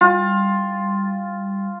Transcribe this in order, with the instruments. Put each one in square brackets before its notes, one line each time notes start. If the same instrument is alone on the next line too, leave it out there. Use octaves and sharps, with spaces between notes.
[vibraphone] G3 [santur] F4